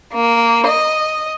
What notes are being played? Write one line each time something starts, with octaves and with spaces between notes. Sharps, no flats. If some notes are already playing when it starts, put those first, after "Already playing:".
A#3
D#5